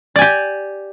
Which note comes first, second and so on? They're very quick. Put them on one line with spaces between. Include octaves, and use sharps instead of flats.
D5 G#5 G4